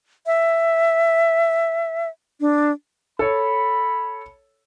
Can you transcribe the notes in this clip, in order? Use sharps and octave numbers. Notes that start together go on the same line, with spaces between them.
E5
D4
A4 C#5 B5